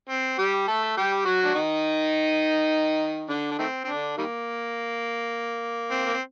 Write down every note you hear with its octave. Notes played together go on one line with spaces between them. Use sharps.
C4
G3 G4
A3 A4
G3 G4
F#3 F#4
D4
D#3 D#4
D3 D4
D4
D#3 A3 C4
C4
D3 D4
D#3 G3 A#3
C4
A#3
C4